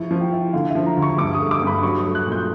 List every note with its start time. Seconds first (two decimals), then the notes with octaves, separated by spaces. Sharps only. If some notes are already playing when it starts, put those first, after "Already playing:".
Already playing: F3 E4 C#6
0.11 F3
0.21 G5
0.32 E4
0.53 D3 F5
0.70 E5
0.75 F3
0.86 A#5
0.97 D2
1.02 C#6
1.18 G2 D6
1.34 D#6
1.39 A3
1.51 D6
1.62 G2 B5
1.83 F#3 C#6
1.99 D#6
2.04 A3
2.15 F#6
2.27 A#2
2.32 G6